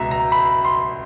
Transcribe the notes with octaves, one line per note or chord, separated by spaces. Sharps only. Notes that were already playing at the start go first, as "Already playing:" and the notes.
Already playing: C#2 B2 E5 A#5
A#5
B5
C6